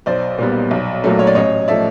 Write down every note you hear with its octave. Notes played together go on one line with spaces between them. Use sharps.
B1 C5 D5
A#2 G3 B3
B1
A#2 F#3 A3
C#5
D5
A1 C#5 D#5
F3 A3 D5 E5